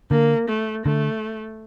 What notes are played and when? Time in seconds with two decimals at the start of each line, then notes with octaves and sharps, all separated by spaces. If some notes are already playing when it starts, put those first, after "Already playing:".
0.11 D3 A#3
0.48 A3
0.86 D3 A3